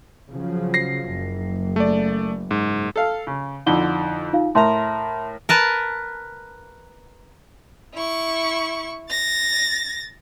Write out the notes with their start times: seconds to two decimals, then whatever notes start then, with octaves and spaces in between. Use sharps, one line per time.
0.30 C#3 F3 F#3
0.74 A#6 C7
1.12 F#1
1.76 A3 D5
2.51 G#2
2.96 A4 F5
3.27 C#3
3.66 F2 D3 D#4 E4 G7
4.33 D#4 F4 F5
4.55 A2 A#4 E5 A5 A#5 C6
5.49 A#4 B4 A5
7.94 E4 C#6
9.10 A6 A#6